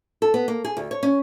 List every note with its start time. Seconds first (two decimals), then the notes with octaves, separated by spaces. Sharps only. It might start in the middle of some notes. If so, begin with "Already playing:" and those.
0.22 A4
0.34 B3
0.48 A#3
0.65 G#4
0.77 D2
0.91 C#5
1.03 C#4